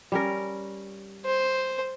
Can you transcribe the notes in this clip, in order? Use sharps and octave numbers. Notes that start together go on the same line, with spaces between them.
G3 C#4 A#4
C5